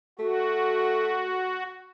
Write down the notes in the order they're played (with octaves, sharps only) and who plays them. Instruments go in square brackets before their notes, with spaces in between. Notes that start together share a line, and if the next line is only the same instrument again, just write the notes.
[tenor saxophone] A3 [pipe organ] F#4